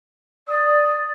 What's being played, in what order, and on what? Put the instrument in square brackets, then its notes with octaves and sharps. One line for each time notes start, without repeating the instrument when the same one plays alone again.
[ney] D5 [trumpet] D#6